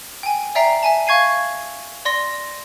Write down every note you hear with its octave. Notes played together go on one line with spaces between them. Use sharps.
G5 G#5
D5 E5 G5 A#5 C7
E5 G#5 A5
F5 C#6 G#6 C7 D#7
D5 C6 A#6